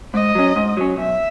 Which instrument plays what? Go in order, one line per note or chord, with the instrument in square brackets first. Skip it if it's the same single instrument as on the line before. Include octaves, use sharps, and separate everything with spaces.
[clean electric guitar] G#2 [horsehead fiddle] D#5
[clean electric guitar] F#3 C#4
G#2
F#3 C#4
[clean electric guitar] B1 [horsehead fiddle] E5